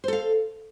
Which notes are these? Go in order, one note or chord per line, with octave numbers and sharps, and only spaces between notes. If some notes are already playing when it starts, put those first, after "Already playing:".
A4 C5 F5